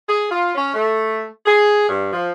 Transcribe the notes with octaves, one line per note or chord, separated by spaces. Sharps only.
G#4
F4
C#4
A3
G#4
G2
F3